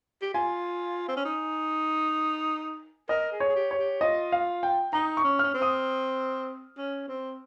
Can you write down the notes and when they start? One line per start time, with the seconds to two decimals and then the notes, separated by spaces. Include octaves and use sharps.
0.22 G4
0.34 F4 G#5
1.08 C4
1.16 C#4
1.25 D#4
3.09 A#4 D#5
3.32 G#4
3.40 C#5
3.49 G#4
3.56 G4
3.71 C#5
3.79 G4
4.01 F4 D#5
4.32 F5
4.63 G5
4.93 D#4 A#5
5.17 C#6
5.24 C#4
5.39 C#4 F6
5.54 C4
5.62 D#6
6.78 C#4
7.08 C4